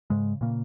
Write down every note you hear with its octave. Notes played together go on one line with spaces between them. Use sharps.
G#2 C#3 G#3
A#2 C#3 A#3